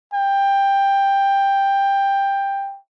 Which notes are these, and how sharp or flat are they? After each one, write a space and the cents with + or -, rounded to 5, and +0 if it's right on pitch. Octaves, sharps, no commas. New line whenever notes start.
G5 +15